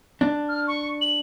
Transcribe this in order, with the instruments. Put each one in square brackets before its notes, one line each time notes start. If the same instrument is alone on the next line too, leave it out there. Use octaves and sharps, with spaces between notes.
[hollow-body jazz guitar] D4
[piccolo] F6
C#6
F#7